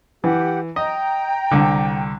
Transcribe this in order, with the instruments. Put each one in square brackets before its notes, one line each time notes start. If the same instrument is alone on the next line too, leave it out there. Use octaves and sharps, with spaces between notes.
[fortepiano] E3 [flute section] G4 F#5
[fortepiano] D#5 [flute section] G5 A#5
[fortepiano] C2 D3